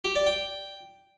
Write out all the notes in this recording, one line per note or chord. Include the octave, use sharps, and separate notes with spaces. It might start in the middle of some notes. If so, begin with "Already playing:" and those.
G4
D5
G5